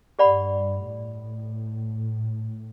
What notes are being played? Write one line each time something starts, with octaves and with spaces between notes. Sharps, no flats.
G2 G4 D5 F#5 B5
A2